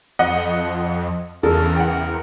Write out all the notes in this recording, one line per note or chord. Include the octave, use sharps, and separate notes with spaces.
F2 D#5 F#5
E2 C#3 A4 A#4
F#5 G5